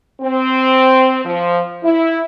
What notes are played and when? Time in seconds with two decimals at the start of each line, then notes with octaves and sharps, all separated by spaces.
0.21 C4
1.25 F3
1.84 E4